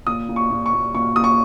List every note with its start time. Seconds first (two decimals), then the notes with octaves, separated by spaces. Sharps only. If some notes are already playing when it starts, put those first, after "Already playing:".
0.07 A#2 D#6
0.29 A#2
0.36 C#6
0.51 A#2
0.66 C#6
0.73 A#2
0.94 A#2 C#6
1.16 A#2 D#6
1.24 C#6